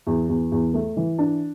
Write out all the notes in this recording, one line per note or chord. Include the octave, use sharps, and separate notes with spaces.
E2
E2
E2
A3
E3
D4